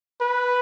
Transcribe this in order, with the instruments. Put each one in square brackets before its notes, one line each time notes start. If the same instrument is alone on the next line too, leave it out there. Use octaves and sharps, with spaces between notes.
[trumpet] B4